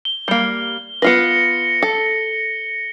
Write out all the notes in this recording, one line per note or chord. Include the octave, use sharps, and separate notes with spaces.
G7
G3 A#3
B3 F4 B4 A#6 C#7
A4